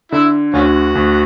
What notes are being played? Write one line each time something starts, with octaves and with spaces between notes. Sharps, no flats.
D3 E4
D2 C#4 F#4
D2